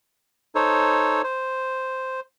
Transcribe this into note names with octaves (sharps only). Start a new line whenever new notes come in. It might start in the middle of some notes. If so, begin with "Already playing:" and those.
D#4 A4 C5 C#5
C5